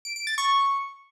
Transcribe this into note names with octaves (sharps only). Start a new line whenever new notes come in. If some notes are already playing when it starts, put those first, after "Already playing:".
D7
D7
A6
C#6